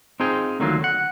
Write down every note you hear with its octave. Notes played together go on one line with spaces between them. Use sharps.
C4 D#4 F4 G#4 G5
D2 D3 D#3 F#3 A#3 F4
F#5